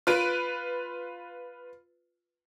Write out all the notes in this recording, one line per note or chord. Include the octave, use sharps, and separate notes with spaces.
F4 B4 D7